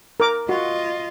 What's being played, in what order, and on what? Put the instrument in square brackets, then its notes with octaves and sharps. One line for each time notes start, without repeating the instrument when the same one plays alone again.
[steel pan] A#4 D6
[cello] F4 D#5 [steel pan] F#4